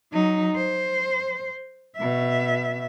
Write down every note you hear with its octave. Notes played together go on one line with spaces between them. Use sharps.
F#3 D#4
C5
B2 E5